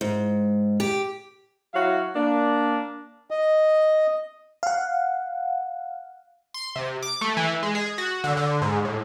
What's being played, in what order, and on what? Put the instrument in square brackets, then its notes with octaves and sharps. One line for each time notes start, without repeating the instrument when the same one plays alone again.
[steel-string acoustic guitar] G#2
G4
[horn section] F#3 E4 F#4 C#5 F5
A#3 D4
[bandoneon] D#5
[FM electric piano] F5 F#5
[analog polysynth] C6
C3
D6
A3
E3
G#3
G#4
F#4
D3
D3
G#2
A2